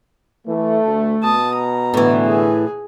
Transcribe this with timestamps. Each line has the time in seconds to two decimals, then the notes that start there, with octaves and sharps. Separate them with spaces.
0.48 E3 A3
0.84 D2
1.23 B2 A5 D#6
1.54 A#5
1.94 A2 D3 E3 B3
2.25 G#4